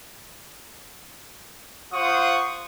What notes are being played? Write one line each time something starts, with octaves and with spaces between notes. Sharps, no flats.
F4 C5 F#5 C#6 D#6